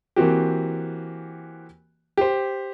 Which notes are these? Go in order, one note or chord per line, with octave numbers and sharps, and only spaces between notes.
E3 A#3 C4 F#4 G4
G4 C5